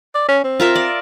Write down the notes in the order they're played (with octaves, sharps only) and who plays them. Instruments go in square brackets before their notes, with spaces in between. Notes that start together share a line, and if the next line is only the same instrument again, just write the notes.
[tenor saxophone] D5
C#4
C4
[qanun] F4 A#4 E5
D5